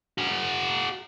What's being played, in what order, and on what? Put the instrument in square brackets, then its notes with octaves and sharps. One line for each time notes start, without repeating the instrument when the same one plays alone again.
[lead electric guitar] F#4 G#4